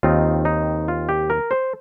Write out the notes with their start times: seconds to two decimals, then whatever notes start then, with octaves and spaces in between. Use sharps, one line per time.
0.03 D#2 D#3 C4 D#4 F4
0.45 D#4
0.88 F4
1.09 G4
1.30 A#4
1.51 C5